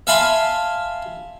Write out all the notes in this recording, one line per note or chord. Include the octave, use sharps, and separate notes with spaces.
E5 F5 G#5 A5 B5 C6